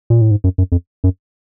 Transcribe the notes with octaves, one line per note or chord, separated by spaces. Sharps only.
A#2
A2
G#2
F#2
F#2
F2
F#2